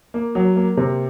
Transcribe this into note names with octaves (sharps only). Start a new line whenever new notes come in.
A#3
F#3
A#3
C3